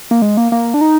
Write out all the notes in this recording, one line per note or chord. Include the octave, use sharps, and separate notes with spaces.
A#3
G#3
A#3
A#3
D4
D#4